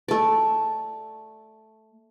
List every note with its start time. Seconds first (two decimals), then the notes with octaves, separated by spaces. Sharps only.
0.08 A3 D5